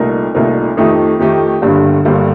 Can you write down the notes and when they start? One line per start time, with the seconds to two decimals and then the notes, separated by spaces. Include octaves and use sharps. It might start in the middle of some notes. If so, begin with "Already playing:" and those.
Already playing: C2 A#2 A3 D#4 A#4
0.34 C2 A#2 A3 D#4 A#4
0.77 F2 D#3 A3 D#4 G4
1.19 F2 D#3 A3 D#4 G4
1.62 G1 G2 D3 G3 A#3
2.05 G1 G2 D3 G3 A#3